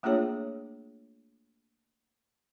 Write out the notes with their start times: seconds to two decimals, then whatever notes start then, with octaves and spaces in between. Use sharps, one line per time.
0.03 A3 A#3 D4 F4 G#4 C#5